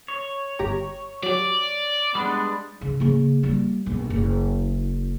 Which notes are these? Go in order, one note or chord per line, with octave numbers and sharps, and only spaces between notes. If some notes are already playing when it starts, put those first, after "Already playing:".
C#5
G1 G4 A#5
F#3 G4 D5
G3 G#3 B3 D4
C#3
C#3 A#3
G3 A#3
A#1 B2
F#1 E4